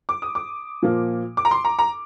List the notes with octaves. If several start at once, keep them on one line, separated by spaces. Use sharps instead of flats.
D6
D#6
D6
A#2 F3 A#3
D6
A#5
C6
A#5
A#5